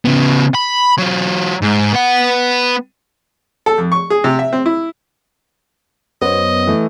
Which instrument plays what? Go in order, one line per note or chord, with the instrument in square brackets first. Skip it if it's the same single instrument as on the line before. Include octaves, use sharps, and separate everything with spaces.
[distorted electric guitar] C#3 B3
B5
F#3 F4
G#2
B3 F#5
[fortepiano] A4
F2
C#6
G#4
C3
E5
C4
E4
[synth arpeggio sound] F#2 B3 [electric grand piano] C5 C#5 [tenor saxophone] D#5
[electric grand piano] E3 A3